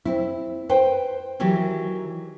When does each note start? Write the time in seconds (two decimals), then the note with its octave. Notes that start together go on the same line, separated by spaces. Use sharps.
0.05 C4 E4
0.69 B4 C5 G5
1.40 D#3 E3 F#3 E4 G4